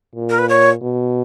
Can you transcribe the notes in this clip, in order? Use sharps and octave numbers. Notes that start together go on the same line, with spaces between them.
A#2
A#4
B4
C#5
B2